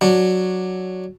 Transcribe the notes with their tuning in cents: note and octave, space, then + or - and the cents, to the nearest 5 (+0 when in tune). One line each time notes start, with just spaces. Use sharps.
F#3 +0 D4 +0